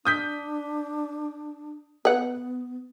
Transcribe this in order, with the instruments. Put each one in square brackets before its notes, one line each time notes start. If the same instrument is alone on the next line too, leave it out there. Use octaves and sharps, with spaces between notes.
[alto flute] D4 [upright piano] D#6 G6 B6
[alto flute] B3 [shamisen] B4 F#5